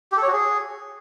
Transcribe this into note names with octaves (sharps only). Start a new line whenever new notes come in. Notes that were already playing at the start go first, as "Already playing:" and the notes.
G4
A4
C#5
F#4
G#4